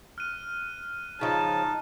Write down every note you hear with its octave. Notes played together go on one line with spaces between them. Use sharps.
F6 F#6 D#7
C#3 F3 D#4 A5